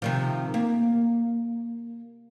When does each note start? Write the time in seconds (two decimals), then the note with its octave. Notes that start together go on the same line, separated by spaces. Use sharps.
0.02 C3 D#3 F3
0.54 A#3